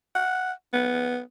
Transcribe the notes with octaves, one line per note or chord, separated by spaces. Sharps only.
F#5
B3